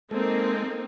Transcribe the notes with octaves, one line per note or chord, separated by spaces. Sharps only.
G#3 A#3 C4 D#4 A4